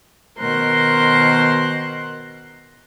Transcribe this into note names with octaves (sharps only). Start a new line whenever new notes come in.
B2 D#3 A#4 C5 C6 F#6